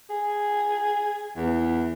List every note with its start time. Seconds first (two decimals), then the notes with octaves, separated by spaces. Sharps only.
0.10 G#4
1.36 E2